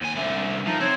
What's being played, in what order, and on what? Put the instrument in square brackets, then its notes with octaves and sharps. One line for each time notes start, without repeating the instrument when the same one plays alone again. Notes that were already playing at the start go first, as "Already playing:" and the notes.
[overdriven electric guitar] D#2 G#5
[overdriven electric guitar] C2 D3 [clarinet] E5
[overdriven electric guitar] F3 [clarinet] D#4
[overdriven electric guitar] C4 [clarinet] C#5